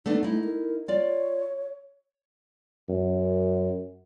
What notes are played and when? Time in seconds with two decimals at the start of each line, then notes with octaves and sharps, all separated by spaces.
0.06 A3 B3 D4 D#4
0.23 A3 D#4 E4
0.44 A#4
0.88 F4 C#5 D5
2.89 F#2